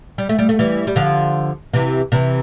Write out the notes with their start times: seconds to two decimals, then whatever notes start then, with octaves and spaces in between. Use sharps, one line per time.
0.18 G3
0.29 A3
0.39 G3
0.49 A3
0.59 E3 G3
0.87 G3
0.96 D3 F3
1.73 C3 E3
2.12 C3 E3